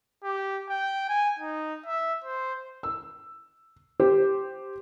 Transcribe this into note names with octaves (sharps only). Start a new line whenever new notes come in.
G4
G5
G#5
D#4
E5
C5
E6
G4 C5